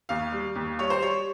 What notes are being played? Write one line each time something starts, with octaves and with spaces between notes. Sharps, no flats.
D#2 F5
G3
D#2
G3 C#5
C5
G3 C#5